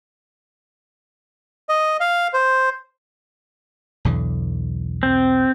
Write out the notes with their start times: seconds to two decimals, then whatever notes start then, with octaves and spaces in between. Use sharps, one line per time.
1.69 D#5
2.00 F5
2.34 C5
4.05 B1 E2 D3
5.03 C4